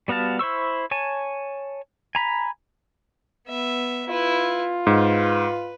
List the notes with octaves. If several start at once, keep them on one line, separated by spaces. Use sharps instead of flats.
G3 B3 F#4 F5 A5
E4 C5 C#6 E6
C#5 G#5 A5
G#5 A#5 B5
B3 E5
E4 F4 B4
G#2 B4